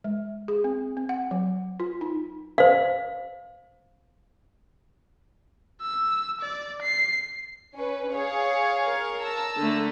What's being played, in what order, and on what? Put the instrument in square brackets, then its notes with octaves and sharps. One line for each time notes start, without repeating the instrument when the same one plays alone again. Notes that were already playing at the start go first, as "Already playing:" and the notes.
[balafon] G#3
G#4
C4
C4
F#5
F#3
F4
D#4
[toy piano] C5 F5
[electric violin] E6
D5
C7
[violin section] C#4 B4
G#4 C#5 F5
[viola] A#4
[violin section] A5 A#5 E6
[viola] D3 A3